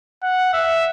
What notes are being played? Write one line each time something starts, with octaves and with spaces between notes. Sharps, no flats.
F#5
E5